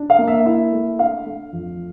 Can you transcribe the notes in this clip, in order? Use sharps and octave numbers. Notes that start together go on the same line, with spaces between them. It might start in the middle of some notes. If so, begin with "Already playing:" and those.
Already playing: D4
F5
A#3
E5
E4 E5
A3
D4 F5
A3
F2